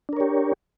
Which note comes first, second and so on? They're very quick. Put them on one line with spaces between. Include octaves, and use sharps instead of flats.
D4 A#4 C#5 G4